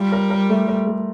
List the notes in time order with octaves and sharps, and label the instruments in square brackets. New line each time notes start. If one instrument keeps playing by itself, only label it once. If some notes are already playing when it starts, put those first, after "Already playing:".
Already playing: [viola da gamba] G3 [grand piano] F4
[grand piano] A#4
A#4
A3
A#4
A3